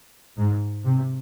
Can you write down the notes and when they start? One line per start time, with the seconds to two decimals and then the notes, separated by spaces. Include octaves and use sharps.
0.38 G#2
0.84 C3